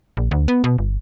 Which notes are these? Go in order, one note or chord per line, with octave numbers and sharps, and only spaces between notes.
A#1
D2
B3
B2
G1